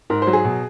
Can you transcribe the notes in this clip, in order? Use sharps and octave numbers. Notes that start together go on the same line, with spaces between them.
G#2 A#4
C5
F#3
G#4
B2